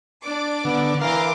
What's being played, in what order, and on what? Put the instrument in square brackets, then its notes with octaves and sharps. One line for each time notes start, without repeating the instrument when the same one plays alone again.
[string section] D4 D5 D6
[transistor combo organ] D3 [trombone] B3
[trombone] E3 [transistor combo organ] A#4 F5 [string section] C6 D6